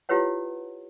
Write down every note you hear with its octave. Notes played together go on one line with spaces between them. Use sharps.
E4 F4 G4 B4 C#5 F#5